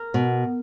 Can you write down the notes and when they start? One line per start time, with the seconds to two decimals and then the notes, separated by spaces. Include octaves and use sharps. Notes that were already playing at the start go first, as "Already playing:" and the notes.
Already playing: A#4
0.14 B2